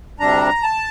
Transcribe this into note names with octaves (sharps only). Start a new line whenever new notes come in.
D2 C3 G3 D4 A#5
A5